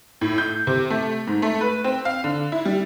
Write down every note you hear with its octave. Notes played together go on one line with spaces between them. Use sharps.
A2
G6
C3
A3
G#2
A3
B4
C4
F5
D3
E4
G3